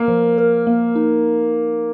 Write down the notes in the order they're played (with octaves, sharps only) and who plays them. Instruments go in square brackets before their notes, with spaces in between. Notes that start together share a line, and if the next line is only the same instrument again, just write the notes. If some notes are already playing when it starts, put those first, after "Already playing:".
Already playing: [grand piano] A#3 [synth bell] A#4
[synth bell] F3
A#4
A#3
D#4